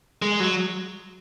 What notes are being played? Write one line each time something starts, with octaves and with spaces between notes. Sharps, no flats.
G#3
F#3